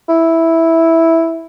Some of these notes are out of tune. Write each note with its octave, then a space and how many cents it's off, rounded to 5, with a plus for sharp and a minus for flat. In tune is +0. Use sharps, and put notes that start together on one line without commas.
E4 -5